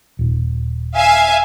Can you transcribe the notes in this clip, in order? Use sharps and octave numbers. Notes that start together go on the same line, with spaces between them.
D#1
E5 F5 G#5